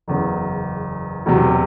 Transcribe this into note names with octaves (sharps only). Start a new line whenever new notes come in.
F#1 E2 C#3
E1 E2 C3 F#3